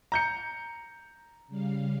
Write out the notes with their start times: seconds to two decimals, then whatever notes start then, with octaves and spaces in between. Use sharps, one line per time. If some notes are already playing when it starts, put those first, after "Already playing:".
0.12 A#5 G6 C#7
1.48 C#3 G3 F5